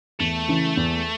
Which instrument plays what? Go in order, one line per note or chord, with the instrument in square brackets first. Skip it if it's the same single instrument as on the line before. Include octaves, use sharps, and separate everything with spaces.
[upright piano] E2 [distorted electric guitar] A3
[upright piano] C#3 E3
E2